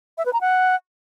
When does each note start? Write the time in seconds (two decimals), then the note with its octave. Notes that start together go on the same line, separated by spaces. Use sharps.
0.18 E5
0.26 B4
0.33 A#5
0.41 F#5